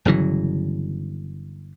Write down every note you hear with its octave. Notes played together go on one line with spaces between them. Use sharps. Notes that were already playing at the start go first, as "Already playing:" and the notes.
G1 C#3 E3 F#3